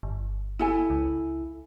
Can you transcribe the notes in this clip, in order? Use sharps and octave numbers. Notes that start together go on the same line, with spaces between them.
G1
E4 A4 G#5
C#2